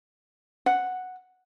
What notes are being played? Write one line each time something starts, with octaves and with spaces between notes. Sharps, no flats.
F#5